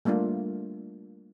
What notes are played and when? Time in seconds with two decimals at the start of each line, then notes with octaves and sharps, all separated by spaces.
0.05 G3 A3 A#3 D4 F4